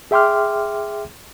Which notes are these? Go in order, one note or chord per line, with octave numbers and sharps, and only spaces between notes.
G#4 E5 G5 C6 D6 F6